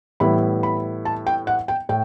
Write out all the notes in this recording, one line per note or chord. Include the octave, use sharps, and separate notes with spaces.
A2 E3 G3 B3 E4 B5
B5
A5
G5
F#5
G5
A2 G5